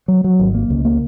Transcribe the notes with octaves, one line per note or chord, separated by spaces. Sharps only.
F#3
F#3
G#1
A#3
C#2
A#3